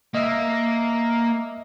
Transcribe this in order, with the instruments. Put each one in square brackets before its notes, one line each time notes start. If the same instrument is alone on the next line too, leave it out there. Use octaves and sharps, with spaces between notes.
[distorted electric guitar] A#3 [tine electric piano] D#5 E5